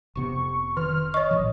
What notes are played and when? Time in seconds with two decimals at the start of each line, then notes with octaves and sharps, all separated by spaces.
0.15 F1 C3 B3 C#6
0.77 D#3 F6
1.14 C#5 D#5 C#6
1.31 A1 A#2 F3